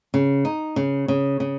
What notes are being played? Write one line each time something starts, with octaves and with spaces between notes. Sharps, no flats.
C#3
D#4
C#3
C#3
C#3